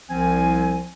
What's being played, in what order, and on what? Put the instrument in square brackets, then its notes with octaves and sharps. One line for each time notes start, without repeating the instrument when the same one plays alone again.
[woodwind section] C2 F3 C4 G#5